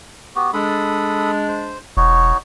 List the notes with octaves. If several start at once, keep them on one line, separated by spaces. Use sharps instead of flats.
B3 F#4 G4
G#3 D4 A4 B5 D#6
C5
E1 D#4 F#4 C#5